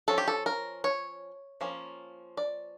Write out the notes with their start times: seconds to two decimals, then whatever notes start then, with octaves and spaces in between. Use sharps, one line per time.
0.08 F3 C#4 A4
0.18 G4
0.28 A4
0.46 A#4
0.84 C#5
1.61 F3 A#3 C#4
2.37 D5